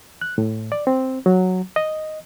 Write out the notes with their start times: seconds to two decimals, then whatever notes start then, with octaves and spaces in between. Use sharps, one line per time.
0.21 F#6
0.38 A2
0.72 D5
0.87 C4
1.26 F#3
1.76 D#5